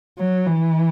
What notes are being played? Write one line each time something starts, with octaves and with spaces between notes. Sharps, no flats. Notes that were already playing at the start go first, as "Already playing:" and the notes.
F#3
E3